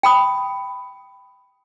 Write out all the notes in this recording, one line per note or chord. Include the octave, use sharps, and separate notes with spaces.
G5 B5 D#6